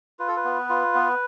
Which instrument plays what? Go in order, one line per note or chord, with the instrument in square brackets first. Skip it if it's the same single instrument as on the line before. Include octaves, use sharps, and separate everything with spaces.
[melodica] F4 B4
A4
B4
B3
F4
B3